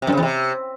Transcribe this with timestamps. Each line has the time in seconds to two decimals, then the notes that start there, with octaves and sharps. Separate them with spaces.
0.02 C3
0.07 F#2
0.12 C#3
0.17 E2
0.23 C3